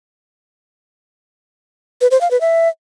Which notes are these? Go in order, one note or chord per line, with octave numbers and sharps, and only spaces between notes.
B4
C5
F5
B4
E5